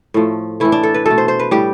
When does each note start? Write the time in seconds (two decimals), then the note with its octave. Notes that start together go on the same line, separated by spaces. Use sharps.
0.14 A2 F3 A3
0.60 A2 E3 A3 E4
0.72 D4
0.83 A4
0.94 B4
1.06 B2 A3 A4
1.18 C5
1.28 C5
1.39 B4
1.51 A2 G3 G4